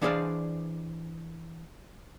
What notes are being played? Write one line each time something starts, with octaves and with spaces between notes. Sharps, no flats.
E3 D4 G#4 C5 D5 F5